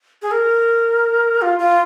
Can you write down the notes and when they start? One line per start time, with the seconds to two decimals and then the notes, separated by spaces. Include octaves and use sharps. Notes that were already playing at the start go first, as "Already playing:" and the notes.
0.22 G#4
0.31 A#4
1.42 F4
1.59 F4